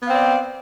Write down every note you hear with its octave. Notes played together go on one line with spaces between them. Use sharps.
B3 C4 D5 F5